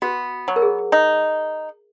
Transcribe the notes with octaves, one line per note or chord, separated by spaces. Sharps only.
B3 F#4
F#3
A#4
G#4
D#4